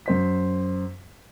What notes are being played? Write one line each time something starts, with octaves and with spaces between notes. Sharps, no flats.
F#2 C5 B6